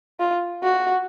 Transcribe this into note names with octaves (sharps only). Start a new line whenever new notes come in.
F4
F#4